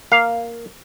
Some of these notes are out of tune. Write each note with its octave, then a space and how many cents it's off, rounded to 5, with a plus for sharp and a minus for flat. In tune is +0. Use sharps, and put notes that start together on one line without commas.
A#3 +0 F5 +0